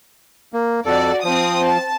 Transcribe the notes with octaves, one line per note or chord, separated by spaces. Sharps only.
A#3
F2 F#4 A4 D5
F3 C4 D#6
A5